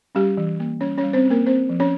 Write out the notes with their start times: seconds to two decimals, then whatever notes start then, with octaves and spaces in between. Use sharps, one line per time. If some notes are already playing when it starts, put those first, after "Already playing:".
0.15 G3 C#4 G4
0.37 E3
0.60 A#3
0.81 G3 C#4 C#5
0.98 C#4 C#5
1.04 G3
1.13 C4 C5
1.25 C#4
1.30 A#3 A#4
1.46 C4 C5
1.69 F3
1.80 C#4 C#5